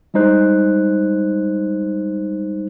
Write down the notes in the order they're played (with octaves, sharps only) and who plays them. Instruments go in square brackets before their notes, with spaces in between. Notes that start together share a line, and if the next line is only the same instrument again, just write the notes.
[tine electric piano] G3 G#3 D#4 C5 F#6